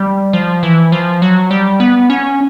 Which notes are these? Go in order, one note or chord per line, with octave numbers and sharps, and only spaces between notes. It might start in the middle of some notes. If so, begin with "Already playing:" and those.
Already playing: G3
F3
E3
F3
F#3
G3
B3
C#4